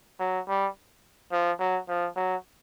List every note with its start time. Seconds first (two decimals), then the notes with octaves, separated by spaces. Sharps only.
0.20 F#3
0.48 G3
1.32 F3
1.60 F#3
1.89 F3
2.16 F#3